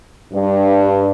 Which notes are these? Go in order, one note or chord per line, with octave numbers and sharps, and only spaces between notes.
G2